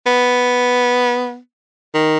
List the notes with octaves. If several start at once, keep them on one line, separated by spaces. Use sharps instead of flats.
B3
D#3